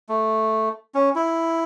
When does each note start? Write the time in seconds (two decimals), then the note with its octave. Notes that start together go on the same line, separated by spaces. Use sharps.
0.09 A3
0.95 C#4
1.15 E4